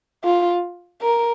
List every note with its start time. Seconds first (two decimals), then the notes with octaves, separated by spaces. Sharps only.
0.24 F4
1.02 A#4